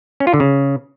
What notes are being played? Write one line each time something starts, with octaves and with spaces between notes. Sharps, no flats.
C#4
F4
D3
C#3